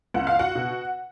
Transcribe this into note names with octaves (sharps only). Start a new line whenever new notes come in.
C#2 F#5
F5
F#4 F#5
B2